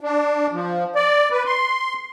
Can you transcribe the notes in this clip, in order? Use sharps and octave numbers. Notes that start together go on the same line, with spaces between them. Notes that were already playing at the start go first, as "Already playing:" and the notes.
D4
F3
D5
B4
C6